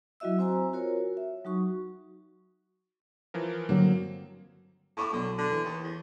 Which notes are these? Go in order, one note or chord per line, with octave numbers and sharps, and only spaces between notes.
F#3 E4 F#4 D#5 E5 E6
C4 C5 G#5 A#5 E6
F4 F#4 A#4 C#5
E5
F#3 D#4 F#4 C#6
E3 F3 A#4
G2 D3 F#3 A#3 C4
A2 A5 C#6 D6
B1 D3
D3
E3
D#2
E2